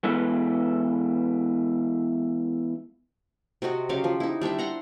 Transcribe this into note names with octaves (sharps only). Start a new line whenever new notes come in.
E3 G#3 B3 E4 A4 B4
C3 C4 F#4 D#5
C#3 F#3 G4 F5
F3
D#4 E4
G3 D4 C5 E5
F#5 A#5 C6